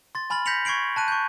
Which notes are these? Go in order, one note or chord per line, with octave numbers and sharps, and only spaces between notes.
C6 A6
G#5 B5 F6 A6 F#7
G6 A#6 B6 C#7 F7 F#7
C#6 G#6 C7 D7 F#7
A5 F#6 D#7
C#6 G6